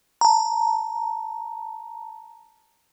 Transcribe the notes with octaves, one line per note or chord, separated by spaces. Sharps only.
A5 A#5